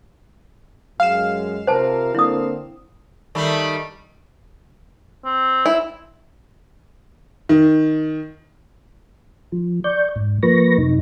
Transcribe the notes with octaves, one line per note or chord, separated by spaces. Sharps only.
F#2 G#3 F5 E7
C3 F4 A#4 C5 A5
D3 A#3 C4 E4 D#6
D#3 G3 A3
C4
E4
D#3
F3
D5 C#6 G6
G#2
F3 A#3 B4 C#6 A#6
F#2 C3 D#4